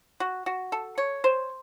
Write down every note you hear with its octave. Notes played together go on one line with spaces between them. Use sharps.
F#4
F#4
A4
C#5
C5